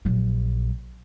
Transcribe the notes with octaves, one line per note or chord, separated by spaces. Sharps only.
A#1 F#3